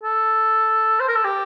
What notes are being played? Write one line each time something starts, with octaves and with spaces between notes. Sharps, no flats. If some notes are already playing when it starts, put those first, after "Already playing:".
A4
C5
A#4
A4
G4